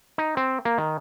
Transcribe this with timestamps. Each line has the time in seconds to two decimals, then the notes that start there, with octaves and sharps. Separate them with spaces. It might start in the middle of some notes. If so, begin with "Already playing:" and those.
0.18 D#4
0.37 C4
0.65 A#3
0.78 D#3